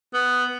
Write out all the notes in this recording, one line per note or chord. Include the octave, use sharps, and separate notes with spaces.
B3